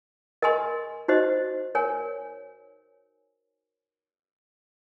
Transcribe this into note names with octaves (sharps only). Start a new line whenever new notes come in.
A#4 D#5 G#5 C6
D#4 F#4 C5 D#5
A#4 C#5 G#5